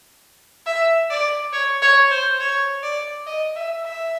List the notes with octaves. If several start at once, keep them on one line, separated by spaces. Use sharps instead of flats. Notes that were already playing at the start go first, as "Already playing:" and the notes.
E5
D5
C#5
C#5
C5
C#5
D5
D#5
E5
E5